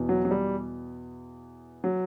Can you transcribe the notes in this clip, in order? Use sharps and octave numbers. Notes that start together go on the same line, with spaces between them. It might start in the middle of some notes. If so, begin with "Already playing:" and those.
Already playing: E2 B2
F#3
F#3
G3
F#3